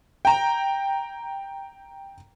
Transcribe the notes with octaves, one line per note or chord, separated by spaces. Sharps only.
G5 A#5